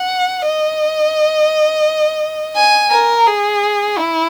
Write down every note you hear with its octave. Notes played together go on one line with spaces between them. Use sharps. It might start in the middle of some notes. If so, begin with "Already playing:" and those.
Already playing: F#5
D#5
G#5
A#4
G#4
E4